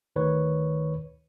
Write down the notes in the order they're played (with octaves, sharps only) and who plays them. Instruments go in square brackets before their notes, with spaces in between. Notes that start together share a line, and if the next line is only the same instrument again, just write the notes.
[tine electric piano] D2 D#3 B4 C#5